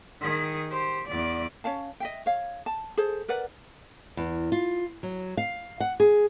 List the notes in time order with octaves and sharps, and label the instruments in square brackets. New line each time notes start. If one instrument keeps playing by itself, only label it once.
[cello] D#3 G#4
G4 C5
E2 D5
[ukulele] C#4 C#5 F5 A5
D#5 E5 G5
C#5 F5
A5
G#4 A4 C5
A#4 B4 D5 F#5
[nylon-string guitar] E2
F4
F#3
F5
F#5
G#4